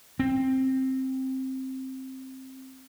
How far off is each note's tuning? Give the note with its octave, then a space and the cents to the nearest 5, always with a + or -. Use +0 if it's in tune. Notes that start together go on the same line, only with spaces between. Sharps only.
C4 +10